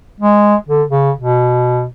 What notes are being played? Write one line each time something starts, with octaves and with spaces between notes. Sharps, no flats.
G#3
D3
C#3
B2